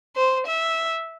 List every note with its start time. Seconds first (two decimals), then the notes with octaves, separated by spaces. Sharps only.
0.16 C5
0.46 E5